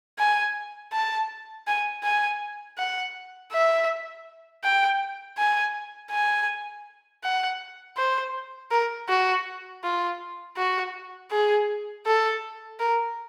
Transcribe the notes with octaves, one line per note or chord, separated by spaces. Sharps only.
G#5
A5
G#5
G#5
F#5
E5
G5
G#5
G#5
F#5
C5
A#4
F#4
F4
F#4
G#4
A4
A#4